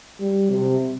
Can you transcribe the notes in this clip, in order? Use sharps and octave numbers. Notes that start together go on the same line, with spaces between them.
G3
C3